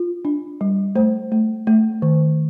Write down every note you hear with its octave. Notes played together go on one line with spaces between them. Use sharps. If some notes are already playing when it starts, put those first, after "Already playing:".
Already playing: F4
D4
G3
A3 C5
A3
A3
D#3